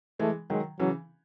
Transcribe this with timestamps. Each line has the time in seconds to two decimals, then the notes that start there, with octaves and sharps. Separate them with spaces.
0.20 E3 G#3 A3
0.50 D#3 F#3 G#3
0.79 C#3 E3 F#3